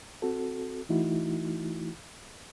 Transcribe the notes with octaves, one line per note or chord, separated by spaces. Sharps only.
C4 F#4 A4
E3 A3 D#4 E4 F#4